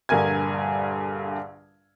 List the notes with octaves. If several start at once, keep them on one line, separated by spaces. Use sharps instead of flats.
A#1 G2 D3 A#4 G#5 G#6